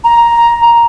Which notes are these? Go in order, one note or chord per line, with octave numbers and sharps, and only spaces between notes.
A#5